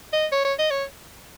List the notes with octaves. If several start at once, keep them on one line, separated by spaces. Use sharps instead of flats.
D#5
C#5
C#5
D#5
C#5